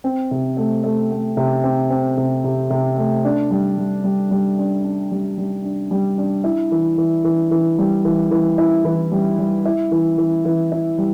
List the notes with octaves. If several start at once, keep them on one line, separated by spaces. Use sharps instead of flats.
C4
C3
A3
A3
A3
C3
C4
C4
C3
C3
C3
A3
D4
G3
G3
G3
G3
D4
D4
G3
G3
D4
G3
D4
E4
E3
E3
E3
E3
G3
E3
E3
E4
E3
G3
G3
E4
E3
E3
E3
E4
G3